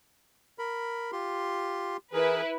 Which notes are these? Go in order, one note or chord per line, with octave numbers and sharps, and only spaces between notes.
A#4 B5
F4 G4 C6
E3 E4 G#4 A#4 B4